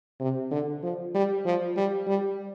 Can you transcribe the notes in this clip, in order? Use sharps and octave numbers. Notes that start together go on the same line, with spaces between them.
C3
D3
F3
G3
F3
G3
G3